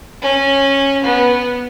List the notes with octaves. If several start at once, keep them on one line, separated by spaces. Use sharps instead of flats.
C#4
B3